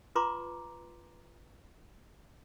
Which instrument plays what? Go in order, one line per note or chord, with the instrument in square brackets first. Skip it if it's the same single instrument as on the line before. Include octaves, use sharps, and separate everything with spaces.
[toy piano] F4 B4 A#5 C6 D6